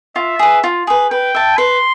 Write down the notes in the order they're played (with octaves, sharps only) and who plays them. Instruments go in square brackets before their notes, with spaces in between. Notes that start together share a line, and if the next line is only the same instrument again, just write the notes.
[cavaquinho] F4 [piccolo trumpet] E5
[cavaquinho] G#4 B4
F4
G#4 B4
[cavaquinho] B4 [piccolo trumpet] G5
[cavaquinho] E5 A5
[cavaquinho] B4 [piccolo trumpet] C6